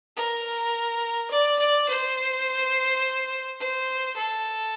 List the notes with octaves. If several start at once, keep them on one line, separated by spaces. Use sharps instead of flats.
A#4
D5
D5
C5
C5
A4